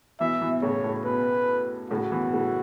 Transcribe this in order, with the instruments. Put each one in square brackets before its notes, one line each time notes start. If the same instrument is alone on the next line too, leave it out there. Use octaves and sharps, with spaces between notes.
[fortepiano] B2 E3 [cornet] E5
[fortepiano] B2 E3
[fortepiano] A2 C#3 [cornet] C#5
[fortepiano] A2
[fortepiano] B2 [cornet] B4
[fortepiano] A2 C#3 [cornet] F#4
[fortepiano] B2 E3
A2 C#3